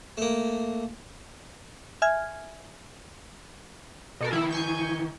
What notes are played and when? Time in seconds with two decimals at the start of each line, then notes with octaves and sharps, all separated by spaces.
0.17 A3 A#3
2.02 E5 G#5 F6 G#6
4.21 B2 A4 A#4
4.33 D#3 E3 E4
4.51 G#5 C#6 G6